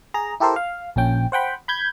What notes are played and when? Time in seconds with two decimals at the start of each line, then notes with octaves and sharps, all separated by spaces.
0.14 G#4 A#5
0.40 E4 G4 A4 A#4 C5
0.56 F5
0.96 A#1 A#2 C#4 G5
1.32 C5 F#5 G5 B5
1.68 B5 G6 G#6